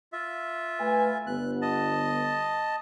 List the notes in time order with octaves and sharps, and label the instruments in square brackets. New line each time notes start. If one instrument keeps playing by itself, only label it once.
[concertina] F4 E5
[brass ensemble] A3 B4 G#5
[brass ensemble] G1 D3 B3 [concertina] F#6
[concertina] D#5 A5